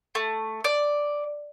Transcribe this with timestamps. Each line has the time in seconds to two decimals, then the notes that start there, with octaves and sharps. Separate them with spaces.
0.15 A3
0.64 D5